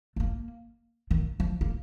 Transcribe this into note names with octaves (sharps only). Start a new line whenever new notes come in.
A3
A#3
D#3
F3
A#3